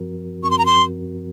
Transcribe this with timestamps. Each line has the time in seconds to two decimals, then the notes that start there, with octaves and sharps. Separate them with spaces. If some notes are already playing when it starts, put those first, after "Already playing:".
Already playing: F#2 F3 C4 F#4 A#4
0.43 F#2 F3 C4 F#4 A#4 C#6
0.51 C6
0.58 A#5
0.66 C6